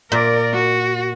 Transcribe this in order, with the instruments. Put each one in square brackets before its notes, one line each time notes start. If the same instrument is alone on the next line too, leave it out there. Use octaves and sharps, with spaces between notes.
[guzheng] A#2 [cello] A#4 D5
[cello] F#4